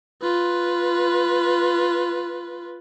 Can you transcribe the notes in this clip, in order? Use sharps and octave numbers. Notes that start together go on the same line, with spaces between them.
F4 B4